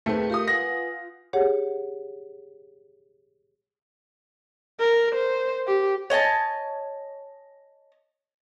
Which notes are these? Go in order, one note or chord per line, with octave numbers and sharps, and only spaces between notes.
D#2 D#3 A3 C4 G#4 B4
F4 G4 A#4 D#6
B4 F#5 G#5 A#6
G4 G#4 C#5 F#5
A#4
C5
G4
C#5 D#5 G#5 A5